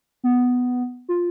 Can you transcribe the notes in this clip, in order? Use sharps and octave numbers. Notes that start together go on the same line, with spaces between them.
B3
F4